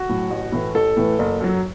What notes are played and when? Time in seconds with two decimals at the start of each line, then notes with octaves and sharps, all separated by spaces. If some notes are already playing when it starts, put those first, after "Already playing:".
Already playing: F#4
0.09 A2 F#3
0.30 A1
0.52 A2 E3 A3
0.75 A1 A4
0.97 A2 E3 A3
1.19 F#1
1.41 F#2 F#3